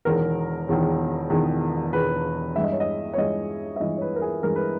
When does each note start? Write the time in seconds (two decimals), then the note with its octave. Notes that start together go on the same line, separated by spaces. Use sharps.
0.05 E1 E2 D#3 A#4
0.68 E1 E2 D#3
1.30 E1 E2 D#3
1.93 E1 E2 D#3 B4
2.56 G2 E3 G#3 E5
2.64 D#5
2.72 C#5
2.80 D#5
3.14 C#5
3.17 G2 E3 G#3 D#5
3.76 E5
3.80 G2 E3 G#3 D#5
3.97 C#5
4.01 B4
4.16 A#4
4.22 G#4
4.43 G2 E3 G#3 A#4
4.56 B4